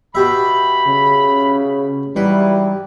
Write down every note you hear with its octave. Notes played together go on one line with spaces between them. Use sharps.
B2 G4 E5 B5
C#3
G#2 E3 F#3 G3 B4